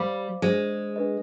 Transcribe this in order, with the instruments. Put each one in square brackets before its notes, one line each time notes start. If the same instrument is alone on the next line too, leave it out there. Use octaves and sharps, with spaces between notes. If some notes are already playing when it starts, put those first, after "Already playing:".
Already playing: [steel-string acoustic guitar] G3 [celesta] C5 F5 B5 D6
[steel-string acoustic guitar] G#3 [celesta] D4 G#4 C5
[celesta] D4 G#4 B4 D#5